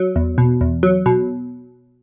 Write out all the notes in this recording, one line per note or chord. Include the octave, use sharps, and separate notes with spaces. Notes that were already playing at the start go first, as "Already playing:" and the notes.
Already playing: F#3
E2
B2
E2
F#3
B2